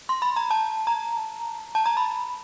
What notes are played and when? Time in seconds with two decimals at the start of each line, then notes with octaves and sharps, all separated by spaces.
0.09 C6
0.22 B5
0.36 A#5
0.51 A5
0.87 A#5
1.75 A5
1.86 A#5
1.97 B5